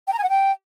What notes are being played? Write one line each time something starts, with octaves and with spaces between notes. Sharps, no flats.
G5
A#5
G#5
F#5
G5